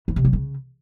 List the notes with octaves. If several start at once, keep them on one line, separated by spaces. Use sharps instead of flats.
E3
C3
F#3
C#3